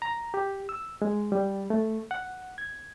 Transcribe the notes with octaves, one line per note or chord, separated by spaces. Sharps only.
A#5
G4
E6
G#3
G3
A3
F#5
G#6